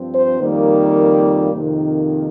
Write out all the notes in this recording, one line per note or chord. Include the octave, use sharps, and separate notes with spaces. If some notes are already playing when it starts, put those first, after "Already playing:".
Already playing: G2 F3 C4
C5
F2 D#3 G3 A#3
F2 C3 D#3 A#3